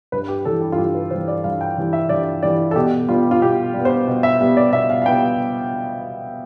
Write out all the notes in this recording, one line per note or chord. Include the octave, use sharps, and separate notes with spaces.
G2 B4
G4
E3 G3 A4
G4
F4
G2 G4
B4
E3 G3 C5
D5
G2 F5
G5
E3 G3
E5
G2 D5
E3 G3 D5
A4
B2 G4
G3 B3 F4
F4
B2 G4
G3
B3
C5
B2
E5
G3 B3
D5
B2 E5
F5
F5
G3 B3 G5